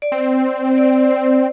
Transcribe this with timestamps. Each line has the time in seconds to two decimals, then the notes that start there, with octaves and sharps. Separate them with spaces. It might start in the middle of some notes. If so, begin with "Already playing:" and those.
0.02 D5
0.12 C4 C5
0.78 D5
1.11 C5